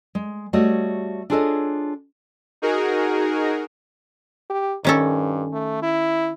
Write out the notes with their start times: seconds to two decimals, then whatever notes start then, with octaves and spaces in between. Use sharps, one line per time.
0.15 G#3
0.53 G3 A3 F#4 C#5 D#5
1.30 D4 F4 G#4 A4 C#5 D#5
2.62 D#4 F#4 G#4 A#4
4.50 G4
4.85 G2 D#3 C#4 A4
5.52 A3
5.82 E4